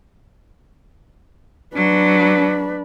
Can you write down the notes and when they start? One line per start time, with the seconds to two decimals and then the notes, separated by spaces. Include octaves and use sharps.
1.76 F#3 D4 B4